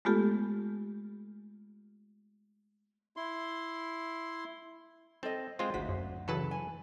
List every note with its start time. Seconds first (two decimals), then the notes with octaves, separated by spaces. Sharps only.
0.05 G#3 A3 B3 F4 G4 A4
3.17 E4 C6
5.23 C4 A4 D#5
5.59 G#3 C4 F4 C5
5.74 G#1 D2 F#4 B6
5.89 F#2
6.28 C#3 E3 F#3 A4 B4 A5
6.51 G#5